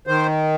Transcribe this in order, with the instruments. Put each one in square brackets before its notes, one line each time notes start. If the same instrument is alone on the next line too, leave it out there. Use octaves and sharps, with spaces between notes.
[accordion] D#3 C5